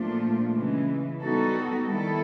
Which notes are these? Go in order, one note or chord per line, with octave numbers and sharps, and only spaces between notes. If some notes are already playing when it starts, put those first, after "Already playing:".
Already playing: A#2 F3 A3 D4 F4
C#3 E3 G#3
G3 B3 D#4 F#4 A4
D#3 G3 B3 E4 A4